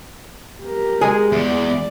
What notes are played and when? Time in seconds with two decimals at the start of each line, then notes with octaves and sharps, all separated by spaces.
0.62 G4 A#4
1.01 G#3 G#4
1.32 E2 D5